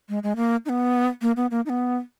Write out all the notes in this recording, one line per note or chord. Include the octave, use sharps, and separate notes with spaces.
G#3
G#3
A#3
D#4
B3
A#3
B3
A#3
D#4
B3